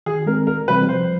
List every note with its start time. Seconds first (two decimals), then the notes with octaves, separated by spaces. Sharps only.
0.06 D#3 G#4
0.26 G#3 C4 A#4
0.47 D2 A#4
0.68 C3 E3 G3 C4 B4
0.89 F3 C5